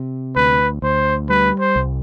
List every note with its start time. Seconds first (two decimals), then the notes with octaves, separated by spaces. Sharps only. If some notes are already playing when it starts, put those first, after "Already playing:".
Already playing: C3
0.36 D2 B4
0.82 D2 C5
1.29 G3 B4
1.59 C5
1.76 C2